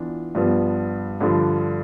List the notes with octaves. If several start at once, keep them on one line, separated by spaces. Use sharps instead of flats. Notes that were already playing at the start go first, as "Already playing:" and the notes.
Already playing: E3 B3 D4 F4
G2 F3 B3
G2 D3 F3